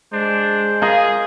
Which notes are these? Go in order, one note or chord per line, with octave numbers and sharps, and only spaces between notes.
G#3 D4 C5
F4 G#4 A#4 D#5